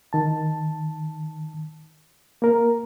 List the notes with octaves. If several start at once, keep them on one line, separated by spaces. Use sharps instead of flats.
D#3 A5
A#3 A#4